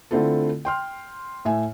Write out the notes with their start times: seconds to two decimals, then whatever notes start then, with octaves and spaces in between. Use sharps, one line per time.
0.11 D3 A3 C4 E4 F4 A4
0.65 G5 C6 F6
1.45 A2 E5 G#5